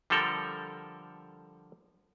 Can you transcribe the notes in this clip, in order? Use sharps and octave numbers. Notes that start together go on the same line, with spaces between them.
D3 F3 G3 A4 A#4